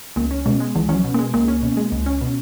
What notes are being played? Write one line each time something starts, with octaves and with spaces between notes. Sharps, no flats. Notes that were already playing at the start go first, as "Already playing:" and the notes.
C#2 A#3
C#4
B2 G#3
G#3
C#2 E3
E3 C#4
F#3
B2
A#3
G#3
C#2 A#3
C#4
B2
G#3
C#2
C#4
B2